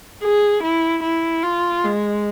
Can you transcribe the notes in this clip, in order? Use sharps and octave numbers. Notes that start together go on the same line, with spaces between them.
G#4
E4
E4
F4
G#3